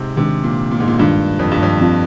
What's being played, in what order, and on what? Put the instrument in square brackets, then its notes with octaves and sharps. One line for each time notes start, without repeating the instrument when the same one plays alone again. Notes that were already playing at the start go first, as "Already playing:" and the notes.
Already playing: [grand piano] G#2 C3
[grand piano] C3 [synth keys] D#3 G#3 D4
[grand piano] A#2
A#2
G#2
A#2
[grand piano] G2 [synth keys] D#3 G#3 D4 F4
[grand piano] F2
G2
F2
[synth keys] F3 C4 F4